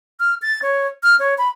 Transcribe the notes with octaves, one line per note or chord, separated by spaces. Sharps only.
F6
A6
C#5
F6
C#5
B5